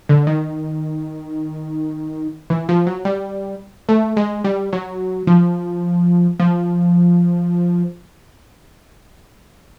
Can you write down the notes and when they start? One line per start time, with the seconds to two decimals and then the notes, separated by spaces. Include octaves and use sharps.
0.09 D3
0.27 D#3
2.50 E3
2.69 F3
2.87 F#3
3.05 G3
3.89 A3
4.17 G#3
4.44 G3
4.73 F#3
5.27 F3
6.40 F3